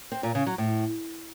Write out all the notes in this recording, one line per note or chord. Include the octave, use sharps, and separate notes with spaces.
C4
A#2
C#3
F#3
A2